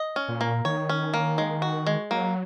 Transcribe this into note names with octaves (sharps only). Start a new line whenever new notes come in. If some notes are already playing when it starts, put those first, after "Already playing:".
Already playing: D#5
C#4
A#2
A#3
D#3 C#5
C#4
A#3
G#3
F#4
G#3
F#3 A#3